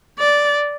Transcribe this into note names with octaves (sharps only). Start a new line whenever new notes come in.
D5